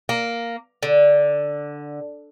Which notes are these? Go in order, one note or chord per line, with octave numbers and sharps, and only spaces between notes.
A#3
D3